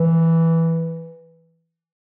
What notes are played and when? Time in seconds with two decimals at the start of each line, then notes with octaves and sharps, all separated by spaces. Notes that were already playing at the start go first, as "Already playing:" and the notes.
Already playing: E3